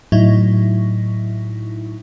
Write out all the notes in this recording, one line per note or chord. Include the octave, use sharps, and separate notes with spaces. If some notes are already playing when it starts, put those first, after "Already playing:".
A2 F#3 D#4 E4